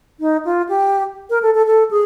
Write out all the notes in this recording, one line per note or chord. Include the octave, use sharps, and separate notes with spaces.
D#4
F4
G4
A#4
A4
A4
A4
G#4